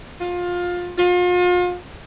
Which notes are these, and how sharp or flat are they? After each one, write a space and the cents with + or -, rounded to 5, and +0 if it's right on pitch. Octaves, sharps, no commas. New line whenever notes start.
F4 +20
F4 +40